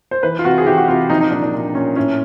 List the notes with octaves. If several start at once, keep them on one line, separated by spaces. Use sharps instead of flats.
C5
E3 B4
F4
C3 F#4
G#4
E3 G4
F#4
C3 F4
F3 D#4
D#4
A#2 D4
D4
A#2
A#2 C#4
A2 C#4